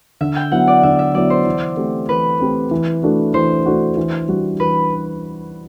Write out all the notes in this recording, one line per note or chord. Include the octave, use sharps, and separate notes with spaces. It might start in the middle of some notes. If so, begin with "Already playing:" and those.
D3 E5
G5
F#3 B3 E4 F#5
D5
D3 E5
E5
F#3 B3 E4 D5
C5
E3
A3 C4 G4
E3 B4
A3 C4 G4
E3
A3 D4 F#4
E3 C5
A3 D4 F#4
E3
G3 D4 F#4
E3 B4